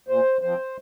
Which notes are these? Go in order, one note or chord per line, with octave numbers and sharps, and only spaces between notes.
A#2 C5
F3 C4 C5